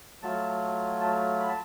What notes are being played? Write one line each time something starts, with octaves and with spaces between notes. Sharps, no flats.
F#3 A3 F4 A5
A5
B5
A5